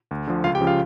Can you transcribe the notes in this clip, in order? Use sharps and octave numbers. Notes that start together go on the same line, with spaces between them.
D2
D3 F3
C#2 F4 F5
G4 G5
C#3 F3
F4 F5